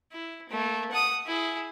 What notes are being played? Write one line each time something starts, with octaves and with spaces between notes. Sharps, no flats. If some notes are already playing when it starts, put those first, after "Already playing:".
E4
A3 A#3
F#5 D#6
E4 G#4